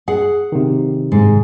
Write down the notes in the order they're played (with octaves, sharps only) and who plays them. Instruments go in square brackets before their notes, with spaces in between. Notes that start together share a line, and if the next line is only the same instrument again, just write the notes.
[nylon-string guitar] G#4 F#5
[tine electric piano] C3 D#3
[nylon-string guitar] G#2